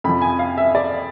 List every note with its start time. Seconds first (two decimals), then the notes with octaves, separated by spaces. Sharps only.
0.04 F2 C3 F3 B5
0.22 G#5
0.39 F5
0.58 E5
0.75 D5